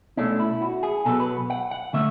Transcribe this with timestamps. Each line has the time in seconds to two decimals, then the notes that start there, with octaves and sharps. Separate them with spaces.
0.17 B2 A3 C#4 D4
0.40 E4
0.62 F#4
0.83 G#4
1.05 B2 F#3 B3 A4
1.20 B4
1.50 F#5
1.71 F#5
1.93 D3 A3 C#4 E5